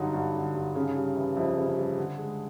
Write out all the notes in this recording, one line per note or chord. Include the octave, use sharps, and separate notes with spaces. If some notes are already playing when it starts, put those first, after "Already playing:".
Already playing: G2 D3 F#3 D#4
G2
D3
G2
C#3
G3
E3
F2 E4
C#3
G3
D3
G#3